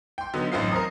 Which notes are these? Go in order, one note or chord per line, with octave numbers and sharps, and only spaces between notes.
G5 C6
D3 F#3 B3 D#4
A1 F#2 C4 D#4 F4 C7
A#4 C5 A#5 D#6